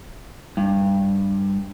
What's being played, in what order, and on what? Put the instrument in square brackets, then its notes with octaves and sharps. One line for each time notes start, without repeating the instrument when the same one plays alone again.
[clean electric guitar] G2